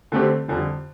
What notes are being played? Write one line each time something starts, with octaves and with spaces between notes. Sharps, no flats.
D3 A3 C4 G4
F2 D3 G3